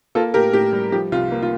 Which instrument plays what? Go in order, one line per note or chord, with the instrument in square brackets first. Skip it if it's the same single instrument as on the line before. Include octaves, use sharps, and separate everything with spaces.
[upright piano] A#3 F4 A4
A2 G4 A#4
A2 G4
G3
F3 G4
C2 F4
A#3
F4